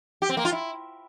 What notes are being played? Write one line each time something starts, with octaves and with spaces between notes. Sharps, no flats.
G4
C4
A#3
F4
E4